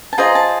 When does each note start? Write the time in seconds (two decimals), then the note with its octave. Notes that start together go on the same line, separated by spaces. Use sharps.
0.13 A5
0.18 F4 G#4 C5 D#5 A#5
0.35 A5